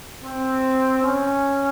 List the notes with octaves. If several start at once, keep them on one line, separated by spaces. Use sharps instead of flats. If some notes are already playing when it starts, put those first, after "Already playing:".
C4
C#4